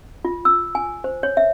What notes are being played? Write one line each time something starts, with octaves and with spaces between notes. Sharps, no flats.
F4
E6
G#5
C5
C#5
E5